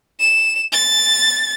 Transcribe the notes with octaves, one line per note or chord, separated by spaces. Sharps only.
E7
A6